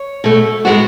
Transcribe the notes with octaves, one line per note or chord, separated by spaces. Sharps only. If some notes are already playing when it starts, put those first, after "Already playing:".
Already playing: C#5
B2 A3
A2 G#3 B3 F#4